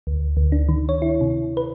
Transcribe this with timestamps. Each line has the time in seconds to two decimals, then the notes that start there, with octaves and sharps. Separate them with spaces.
0.07 D2
0.37 D2
0.52 D4
0.69 D#3
0.89 C#5
1.02 E4
1.21 C3
1.57 B4